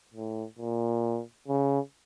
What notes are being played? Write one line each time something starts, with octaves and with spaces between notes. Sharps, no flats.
A2
A#2
C#3